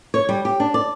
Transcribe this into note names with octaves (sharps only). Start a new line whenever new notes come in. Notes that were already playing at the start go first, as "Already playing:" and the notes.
C#5
G3
G4
D4
D5